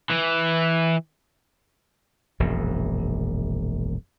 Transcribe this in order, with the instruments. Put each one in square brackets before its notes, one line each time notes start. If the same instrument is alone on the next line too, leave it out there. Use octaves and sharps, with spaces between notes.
[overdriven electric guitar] E3
[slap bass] E1 A#1 F#2